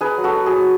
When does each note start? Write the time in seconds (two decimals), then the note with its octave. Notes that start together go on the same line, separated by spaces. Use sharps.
0.01 D#4 G#4 B4
0.17 F#3
0.24 F#4 A4
0.36 D#4
0.46 G#4
0.52 F#3